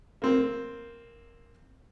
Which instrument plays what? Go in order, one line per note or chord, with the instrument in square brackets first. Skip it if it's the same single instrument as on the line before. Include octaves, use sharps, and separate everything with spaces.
[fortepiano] A#3 C4